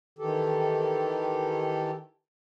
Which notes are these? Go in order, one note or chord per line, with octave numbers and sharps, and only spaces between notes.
D#3 E3 G4 A4